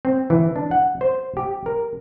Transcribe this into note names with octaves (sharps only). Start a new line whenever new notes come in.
C4
E3
D4
F#5
C5
G4
A#4